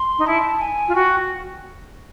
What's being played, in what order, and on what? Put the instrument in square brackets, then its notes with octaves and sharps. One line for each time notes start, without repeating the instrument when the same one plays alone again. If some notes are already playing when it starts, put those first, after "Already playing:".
Already playing: [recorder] C6
[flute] D#4
[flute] E4 [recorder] A5
[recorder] G#5
[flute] F4
[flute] F#4 [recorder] G5